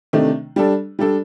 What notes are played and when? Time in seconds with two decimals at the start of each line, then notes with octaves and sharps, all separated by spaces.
0.13 C3 D#3 A3 D4
0.56 G3 D4 A4
0.99 G3 D4 A4